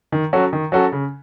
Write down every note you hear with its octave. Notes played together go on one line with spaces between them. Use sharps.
D#3
F#3 C#4 F#4 A4
D#3
F#3 C#4 F#4 A4
C#3